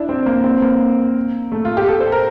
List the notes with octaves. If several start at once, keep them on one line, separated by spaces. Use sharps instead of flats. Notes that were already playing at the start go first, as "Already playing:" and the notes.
Already playing: D4 E4
C4
A#3
C4
A#3
A3
F4
G4
A4
C5
A#4